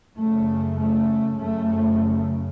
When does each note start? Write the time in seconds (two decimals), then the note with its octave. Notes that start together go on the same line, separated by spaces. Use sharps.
0.18 F#2 C#3 A3
0.79 A3
1.39 F#2 C#3 A3